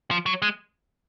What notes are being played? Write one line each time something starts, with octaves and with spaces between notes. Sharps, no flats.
F3
F#3
G#3